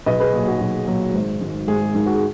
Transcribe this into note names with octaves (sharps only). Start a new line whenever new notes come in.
B1 B4 D#5
G#4 B4
A#2 F#3 G#4
F#4
B1
A#2 F#3
G#1
G#2 D#3
G#1 G#4
G#2 D#3
F#4
G#4